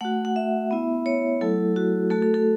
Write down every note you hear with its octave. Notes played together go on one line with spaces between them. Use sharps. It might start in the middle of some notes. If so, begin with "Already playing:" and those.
A3 F#4 F#5
F#5
E5
B3 E4
C#5
F#3 A3 E4 A4
F#4
A3 F#4 A4
A4
A4